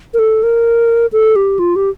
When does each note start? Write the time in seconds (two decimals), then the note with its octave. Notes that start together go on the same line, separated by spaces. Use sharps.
0.14 A#4
0.19 A4
0.43 A#4
1.13 A4
1.36 G4
1.59 F4
1.76 G4